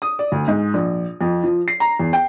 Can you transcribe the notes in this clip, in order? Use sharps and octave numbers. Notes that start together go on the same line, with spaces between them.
D#6
D5
D2
G#2
A#1
F2
F3
C7
A#5
E2
G5